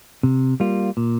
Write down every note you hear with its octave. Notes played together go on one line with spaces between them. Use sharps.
C3
G3 A#3 F4
A#2